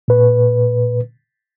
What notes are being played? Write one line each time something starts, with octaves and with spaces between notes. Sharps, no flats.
A#2 B4